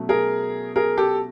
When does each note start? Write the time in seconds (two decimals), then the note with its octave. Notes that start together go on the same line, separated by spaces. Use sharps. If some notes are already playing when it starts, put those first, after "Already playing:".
Already playing: B2 F#3 A3 C#4
0.09 G#4 A#4
0.76 G#4 A#4
0.98 G4 A4